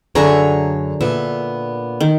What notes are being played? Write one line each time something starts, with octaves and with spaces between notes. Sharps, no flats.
F#2 D3 G#4 C#5 E5 A#5
A#2 B3 E5
D#3